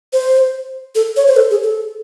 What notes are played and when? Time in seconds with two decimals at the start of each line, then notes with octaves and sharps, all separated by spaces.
0.13 C5
0.95 A4
1.16 C#5
1.27 C5
1.36 A4
1.51 G#4
1.63 A4